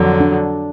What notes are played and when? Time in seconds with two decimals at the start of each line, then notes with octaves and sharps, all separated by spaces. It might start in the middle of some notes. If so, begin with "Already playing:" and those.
Already playing: F2 D3 F#3
0.20 D4